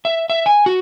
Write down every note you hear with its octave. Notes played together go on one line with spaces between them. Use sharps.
E5
E5
G#5
F#4